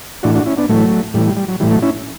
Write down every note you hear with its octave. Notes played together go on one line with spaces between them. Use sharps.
A2 E3 D4 F#4
D4 F#4
C#4 E4
B3 D4
A2 E3 F#3 A3
A2 E3 G3
G3
G3
F#3
A2 E3 G3
F#3 A3
C#4 E4